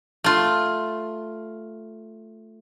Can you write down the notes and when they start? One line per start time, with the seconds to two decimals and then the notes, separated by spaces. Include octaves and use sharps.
0.24 A3 F4